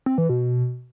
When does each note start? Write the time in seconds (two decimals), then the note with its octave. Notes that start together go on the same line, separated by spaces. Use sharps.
0.06 C4
0.18 E3
0.29 B2